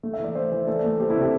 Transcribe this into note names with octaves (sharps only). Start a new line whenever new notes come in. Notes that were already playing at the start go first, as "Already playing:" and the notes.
A3
E5
E3 D5
A3 C5 E5
E3
A3 A4 D5
A3
A3 G4 C5
E4 A4
C3
G4